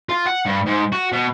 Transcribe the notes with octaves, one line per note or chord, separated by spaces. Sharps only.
F4
F#5
G2
G#2
F#4
B2